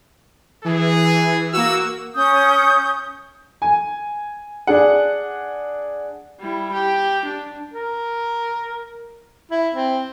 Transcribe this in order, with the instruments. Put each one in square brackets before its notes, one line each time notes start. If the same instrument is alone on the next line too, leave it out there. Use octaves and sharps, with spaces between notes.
[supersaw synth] E3 [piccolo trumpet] G#4
[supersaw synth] A#3 F#4 [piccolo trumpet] E6
[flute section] C#4 D#6 G6
[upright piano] G#5
D4 G#4 F#5
[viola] G3 E4
G4
D4
[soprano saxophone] A#4
E4
C4